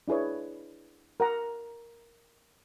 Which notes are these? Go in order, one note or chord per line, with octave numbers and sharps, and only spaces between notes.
D4 E4 G#4 B4 C#5
A#4 F#5 A#5